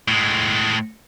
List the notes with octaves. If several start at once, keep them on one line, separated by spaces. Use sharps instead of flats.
A2 G#3